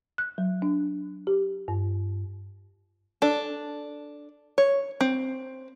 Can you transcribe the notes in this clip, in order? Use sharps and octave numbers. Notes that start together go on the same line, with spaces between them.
F#6
F#3
D4
G4
G2
D4 A4
C#5
C4